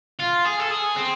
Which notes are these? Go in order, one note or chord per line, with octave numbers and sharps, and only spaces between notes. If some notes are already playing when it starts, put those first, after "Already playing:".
F4
G#4
A4
G#4
C4